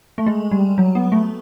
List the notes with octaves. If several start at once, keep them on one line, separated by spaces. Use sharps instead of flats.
A3
G#3
G3
F#3
B3
A3